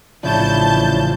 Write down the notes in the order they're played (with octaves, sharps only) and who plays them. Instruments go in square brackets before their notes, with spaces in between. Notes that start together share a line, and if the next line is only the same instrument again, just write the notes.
[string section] A1 A5 G6 [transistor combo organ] C#3 F3 [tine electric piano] D4 E4 C#5